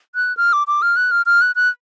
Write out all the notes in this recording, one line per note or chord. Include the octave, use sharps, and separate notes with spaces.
F#6
F6
D6
D6
F6
F#6
F6
F6
F#6
F#6